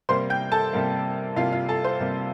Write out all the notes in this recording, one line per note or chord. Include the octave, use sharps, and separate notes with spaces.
C3 G3 A#3 C5 C6
G5 G6
A4 A5
C3 G3 A#3
C3 G3 A#3 F4 F5
F4 F5
A4 A5
C5
C3 G3 A#3